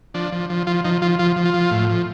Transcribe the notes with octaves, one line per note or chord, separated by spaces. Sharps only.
F3 D4
F3
F3
F3 F4
F3 D#4
F3 F4
F3 F4
F3
F4
F3
A2
F3